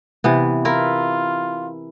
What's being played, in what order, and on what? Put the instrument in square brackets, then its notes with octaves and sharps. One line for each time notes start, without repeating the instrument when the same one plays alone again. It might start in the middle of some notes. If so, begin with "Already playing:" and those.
[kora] C3 E3 B3
[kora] E4 A#4 [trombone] F4